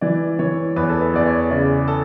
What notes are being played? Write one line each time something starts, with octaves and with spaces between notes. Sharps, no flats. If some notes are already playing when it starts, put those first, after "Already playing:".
E3 D5
E3 C#5
E2 B4
A4
B4
E2 D5
C#5
C#3 D5
A4